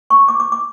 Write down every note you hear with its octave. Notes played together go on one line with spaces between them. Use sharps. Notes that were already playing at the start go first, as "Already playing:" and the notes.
C#6
D6
D6
D6